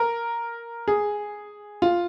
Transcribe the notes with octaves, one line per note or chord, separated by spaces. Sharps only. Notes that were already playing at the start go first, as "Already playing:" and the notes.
Already playing: A#4
G#4
F4